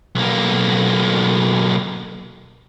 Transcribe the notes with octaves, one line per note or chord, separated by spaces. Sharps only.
B1 A#3